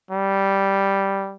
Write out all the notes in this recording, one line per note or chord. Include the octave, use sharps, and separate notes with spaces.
G3